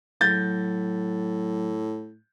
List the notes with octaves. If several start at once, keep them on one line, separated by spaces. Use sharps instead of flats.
A2 F#3 G6 A6